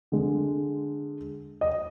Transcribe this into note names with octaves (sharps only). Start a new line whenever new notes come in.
D3 G#3
D#5